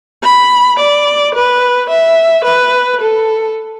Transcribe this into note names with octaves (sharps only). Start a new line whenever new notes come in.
B5
D5
B4
E5
B4
A4